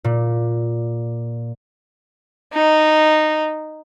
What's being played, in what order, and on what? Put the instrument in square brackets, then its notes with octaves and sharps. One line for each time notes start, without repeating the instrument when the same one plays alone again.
[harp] A#2
[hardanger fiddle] D#4